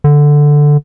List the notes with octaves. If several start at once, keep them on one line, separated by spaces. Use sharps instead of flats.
D3